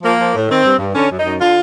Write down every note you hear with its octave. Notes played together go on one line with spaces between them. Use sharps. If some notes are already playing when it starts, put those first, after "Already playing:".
F3 A#3
F3
A2
D#3 C4
G2
G2
D3 C#4
F#2
D#4
F#2
D3 F4